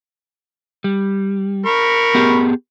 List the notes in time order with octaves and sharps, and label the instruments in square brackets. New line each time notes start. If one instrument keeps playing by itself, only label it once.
[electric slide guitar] G3
[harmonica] A#4 B5 C#6
[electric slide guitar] B3 G4 G#4